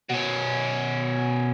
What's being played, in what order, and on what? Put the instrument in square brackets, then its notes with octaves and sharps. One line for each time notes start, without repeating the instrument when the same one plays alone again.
[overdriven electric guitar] B2 C#4